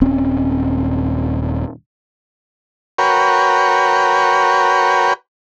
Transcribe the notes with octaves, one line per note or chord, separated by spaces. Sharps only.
D#1 C4 C#4
F#4 A#4 B4 C#5 G5